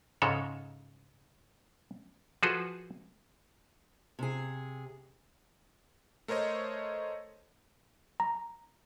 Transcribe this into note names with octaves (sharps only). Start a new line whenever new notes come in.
G#2 C#3 G#3 A4 C#5
F3 F#4 G#4 A4 B4 C5
C3 G#4
A3 A#4 C5 C#5 D#5
A#5